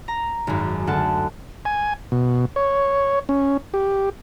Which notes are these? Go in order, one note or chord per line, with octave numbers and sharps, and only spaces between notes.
A#5
G#1 F#2
D2 F#5 A5
G#5
B2
C#5
C#4
G4